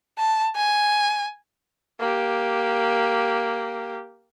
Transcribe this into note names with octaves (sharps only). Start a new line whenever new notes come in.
A5
G#5
A#3 G4